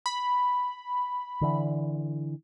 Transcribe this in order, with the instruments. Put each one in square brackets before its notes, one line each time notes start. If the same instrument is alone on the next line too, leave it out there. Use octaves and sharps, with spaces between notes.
[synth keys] B5
[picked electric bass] D3 E3